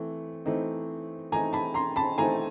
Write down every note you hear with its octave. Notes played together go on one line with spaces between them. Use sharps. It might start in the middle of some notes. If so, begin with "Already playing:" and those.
Already playing: E3 A3 C4
E3 A3 C4 D#4
E3 A3 C4 D#4 G#5 A#5
A5 B5
A#5 C6
A5 B5
E3 A3 C4 D#4 G#5 A#5